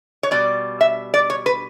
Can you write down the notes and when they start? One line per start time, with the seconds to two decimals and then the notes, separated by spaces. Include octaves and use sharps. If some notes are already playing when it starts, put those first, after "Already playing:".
0.23 C#5
0.31 B2 G3 D5
0.81 E5
1.14 D5
1.30 C#5
1.46 B4